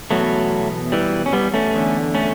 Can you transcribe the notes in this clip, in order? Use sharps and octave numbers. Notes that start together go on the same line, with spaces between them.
E2 B2 F#3 A3
E3 G3
C#4
G3 B3
A3 C#4
E2 D3
A3 C#4